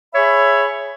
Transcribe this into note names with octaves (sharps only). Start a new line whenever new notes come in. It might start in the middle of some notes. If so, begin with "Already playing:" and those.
G#4 C#5 E5 B5